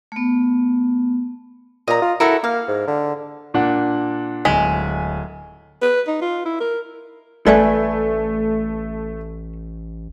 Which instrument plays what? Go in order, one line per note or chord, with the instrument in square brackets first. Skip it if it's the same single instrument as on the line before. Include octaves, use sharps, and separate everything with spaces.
[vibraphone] A3 B3
[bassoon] A#2 [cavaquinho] D#5 A#5
[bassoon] F4
[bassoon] E4 [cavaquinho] F#4 A4 A#4
[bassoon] A#3 [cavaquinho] F5
[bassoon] G#2
D3
[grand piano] A#2 D4 F#5
[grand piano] D1 G#5 B6 [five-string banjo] G#3
[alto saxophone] B4
D#4
F4
E4
A#4
[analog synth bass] A1 [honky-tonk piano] A3 [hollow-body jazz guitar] A4 B4 E5 [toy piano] D5 G#5